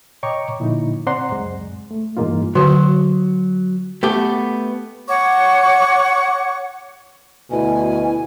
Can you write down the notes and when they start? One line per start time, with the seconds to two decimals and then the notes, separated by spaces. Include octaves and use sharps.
0.23 C#5 D#5 G5 A#5 C#6 D6
0.60 A#2 D3 F3 D#4 E4
1.07 C4 C5 D5 F#5 A#5 C6
1.32 C#2 F#2 G#3
1.91 A3
2.17 G2 E3 G#3 A#3 D#4 F4
2.55 D3 F#3 F#4
4.03 A3 B3 G4
5.08 C#5 F#5 C#6 D6
7.51 D2 B2 E4 G#5